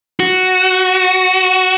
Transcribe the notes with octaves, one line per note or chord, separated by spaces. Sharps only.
F#4